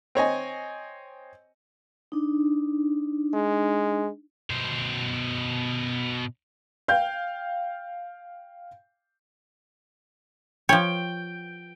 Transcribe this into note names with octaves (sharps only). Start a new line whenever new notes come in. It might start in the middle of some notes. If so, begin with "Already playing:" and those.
C4 C#5 D#5 G#5
D4 D#4
G#3
B2 C5
F5 G5 G6
F3 C#5 G5